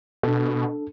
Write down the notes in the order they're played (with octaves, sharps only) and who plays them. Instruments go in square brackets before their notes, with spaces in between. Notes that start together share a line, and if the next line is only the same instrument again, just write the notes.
[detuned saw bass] B2 [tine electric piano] D4 A4